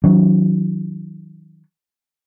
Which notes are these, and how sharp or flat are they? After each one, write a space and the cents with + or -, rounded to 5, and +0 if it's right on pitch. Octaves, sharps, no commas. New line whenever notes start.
D#3 +35 F#3 +0 D4 -40